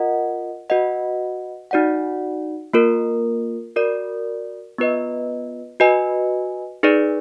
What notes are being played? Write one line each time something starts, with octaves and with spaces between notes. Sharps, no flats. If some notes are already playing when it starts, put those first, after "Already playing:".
Already playing: F4 A#4 D#5 F#5
F#4 B4 D#5 F#5
D#4 F#4 D5 F#5
A#3 F4 A#4
F#4 A#4 D5
B3 F4 B4 D#5
F#4 B4 D#5 G#5
D#4 G#4 B4 D5